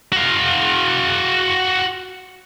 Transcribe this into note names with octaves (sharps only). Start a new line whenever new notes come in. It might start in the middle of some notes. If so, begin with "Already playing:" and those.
F#4 F5